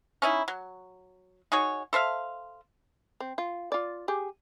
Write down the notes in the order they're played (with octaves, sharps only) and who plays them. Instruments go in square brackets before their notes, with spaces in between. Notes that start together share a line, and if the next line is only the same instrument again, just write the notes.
[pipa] C#4 D#4 E4
F#3
D#4 F#4 G#4 C#5
A4 C5 E5 F5
[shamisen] C4
F4
F4 D5
G4 G#4